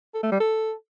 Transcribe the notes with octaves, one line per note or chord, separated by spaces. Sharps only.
A4
A3
G3
A4